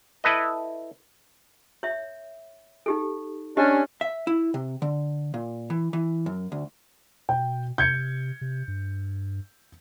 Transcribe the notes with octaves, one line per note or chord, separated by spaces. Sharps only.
E4 A4 B4 D#5
C#5 E5
D#4 G4 A4
C#4 D4 G4 D#5
E5
E4
C3
D3
A#2
E3
E3
F#2
D2
B2 G5
C3 G6 G#6 C#7
C3
G2